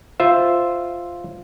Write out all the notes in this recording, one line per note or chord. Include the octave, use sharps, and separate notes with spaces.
F4 C5 E5